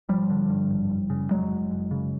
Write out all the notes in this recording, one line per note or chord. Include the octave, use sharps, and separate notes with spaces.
G#1 F3 G3
D3
G2
G#1
F#1
C#3
F2 F#3 G#3
F#1
F#1
C#3